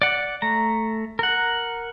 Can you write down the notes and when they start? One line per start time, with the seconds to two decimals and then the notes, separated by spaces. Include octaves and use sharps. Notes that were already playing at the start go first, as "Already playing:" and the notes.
0.02 D5 F#5
0.42 A3 A#5
1.19 A#4 F#5